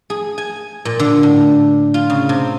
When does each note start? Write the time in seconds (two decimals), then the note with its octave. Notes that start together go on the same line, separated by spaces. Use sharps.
0.10 G#4
0.38 G#5
0.85 A#2
1.00 D3
1.23 A2
1.94 F4
2.10 C#3
2.29 C3